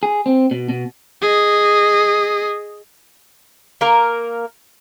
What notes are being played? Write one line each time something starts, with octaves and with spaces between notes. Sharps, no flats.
G#4
C4
B2
B2
G#4 D#5
A#3 A#4